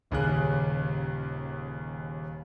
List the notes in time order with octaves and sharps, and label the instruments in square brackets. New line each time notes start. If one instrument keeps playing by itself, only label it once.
[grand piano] D#1 D#2 C#3 C#4 G#4 F#6